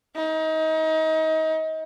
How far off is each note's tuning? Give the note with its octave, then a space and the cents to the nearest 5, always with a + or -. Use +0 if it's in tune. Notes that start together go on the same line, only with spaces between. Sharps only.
D#4 +30